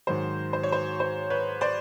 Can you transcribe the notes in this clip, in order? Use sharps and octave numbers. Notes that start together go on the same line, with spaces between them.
G#2 D#3 F#3 C5
C5
C#5
C5
C5
B4 C#5
C5 D5